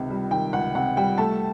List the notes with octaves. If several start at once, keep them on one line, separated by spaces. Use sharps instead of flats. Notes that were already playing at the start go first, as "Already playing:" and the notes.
Already playing: C#2 C3 D#3
G3
D#3 G5
C#2 F#5
C3 F#5
G3 G5
A3 A5